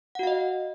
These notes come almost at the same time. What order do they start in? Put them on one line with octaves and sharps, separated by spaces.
F#5 F#4 F5 D#5